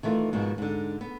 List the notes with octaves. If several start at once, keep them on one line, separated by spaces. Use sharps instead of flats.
D#3 E3 A3 F4
G#2 B2 D#3 F3
G#2 D3
B3